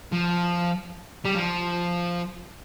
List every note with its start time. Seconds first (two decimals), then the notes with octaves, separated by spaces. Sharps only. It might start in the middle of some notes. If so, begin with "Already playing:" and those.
0.13 F3
1.25 G3
1.35 F3